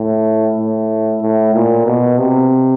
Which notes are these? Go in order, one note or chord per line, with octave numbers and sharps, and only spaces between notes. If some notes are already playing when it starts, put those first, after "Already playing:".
Already playing: A2
A2
A2
A#2
B2
C3